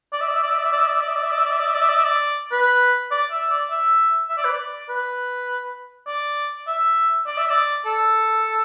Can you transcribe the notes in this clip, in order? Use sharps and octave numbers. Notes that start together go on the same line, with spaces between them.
D5
E5
D5
E5
D5
E5
D5
E5
D5
E5
D5
E5
D5
E5
D5
E5
D5
E5
D5
E5
D5
E5
D5
E5
D5
E5
D5
B4
D5
E5
D5
E5
E5
D5
B4
D5
B4
D5
E5
D5
E5
D5
A4